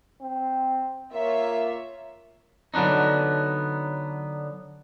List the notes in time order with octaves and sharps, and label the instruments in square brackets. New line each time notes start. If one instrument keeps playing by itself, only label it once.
[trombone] C4
[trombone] A#3 [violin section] F4 C#5 E5
[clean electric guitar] D3 F#3 B3 D4 D#4